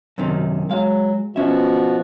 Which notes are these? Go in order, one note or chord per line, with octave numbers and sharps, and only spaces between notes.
F#2 C3 D#3
F#3 G#3 F5
B2 F3 C#4 F#4 E5